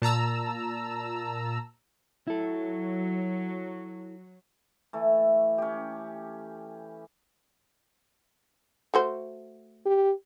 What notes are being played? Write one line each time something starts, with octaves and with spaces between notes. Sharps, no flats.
A#2 A5 A#5 E6
F#3 E4 A4
E3 A3
C#4 G4
A3 F#4 C5
G4